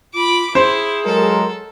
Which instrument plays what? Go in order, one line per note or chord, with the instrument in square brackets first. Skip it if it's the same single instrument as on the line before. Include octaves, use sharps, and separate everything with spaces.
[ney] F4 [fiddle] B5 D6
[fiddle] E4 [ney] G#4 [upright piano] C5
[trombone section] F#3 G#3 A#4 [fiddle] A4